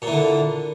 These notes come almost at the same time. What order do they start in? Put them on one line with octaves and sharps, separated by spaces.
A#2 E3 D3